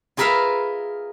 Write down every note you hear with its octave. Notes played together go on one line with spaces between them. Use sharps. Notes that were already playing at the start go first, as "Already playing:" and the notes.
F4 G#4 A#4 B4 E5 F5